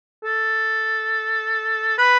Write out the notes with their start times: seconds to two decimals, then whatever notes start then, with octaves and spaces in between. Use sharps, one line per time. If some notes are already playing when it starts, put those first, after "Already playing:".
0.24 A4
1.98 B4